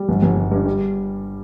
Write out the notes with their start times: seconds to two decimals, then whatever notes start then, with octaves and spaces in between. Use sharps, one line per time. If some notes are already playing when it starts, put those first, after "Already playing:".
Already playing: G3
0.09 G1
0.23 G1
0.37 G1
0.52 G2
0.66 G3